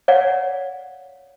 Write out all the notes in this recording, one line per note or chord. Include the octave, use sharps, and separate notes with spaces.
C#5 D5 F5 F#5